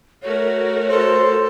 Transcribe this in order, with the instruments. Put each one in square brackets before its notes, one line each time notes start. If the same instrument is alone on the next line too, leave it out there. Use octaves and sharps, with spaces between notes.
[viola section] A3 F#4 A#4 [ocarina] C#5
[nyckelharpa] A4 [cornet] C5